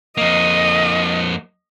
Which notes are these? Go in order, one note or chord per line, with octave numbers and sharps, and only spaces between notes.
F2 A#3 D#5